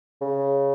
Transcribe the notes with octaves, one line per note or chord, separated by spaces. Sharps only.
C#3